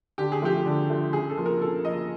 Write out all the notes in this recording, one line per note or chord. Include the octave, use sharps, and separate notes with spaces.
D3 G4
G#4
F3 A3 G4
D3
F3 A3
C#3 G#4
A4
F3 A#3
A#4
C#3 A4
F3 A#3 D#5